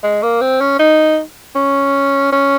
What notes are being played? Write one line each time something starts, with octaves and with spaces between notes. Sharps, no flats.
G#3
A#3
C4
C#4
D#4
C#4
C#4